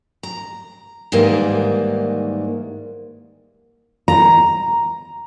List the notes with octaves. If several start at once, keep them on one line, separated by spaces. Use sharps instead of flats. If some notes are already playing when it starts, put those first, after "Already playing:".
A#5
G#2 D#3 E3 G3 A#3
A#5